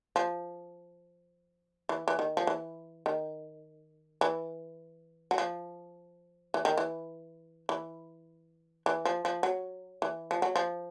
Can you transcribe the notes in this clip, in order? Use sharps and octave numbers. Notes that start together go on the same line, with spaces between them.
F3
E3
E3
D#3
F3
E3
D#3
E3
F#3
F3
E3
D#3
E3
E3
E3
F3
F3
F#3
E3
F3
F#3
F3